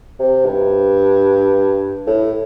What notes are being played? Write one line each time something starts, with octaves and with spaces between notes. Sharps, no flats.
C3
G2
A2